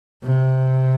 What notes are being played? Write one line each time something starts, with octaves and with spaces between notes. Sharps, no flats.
C3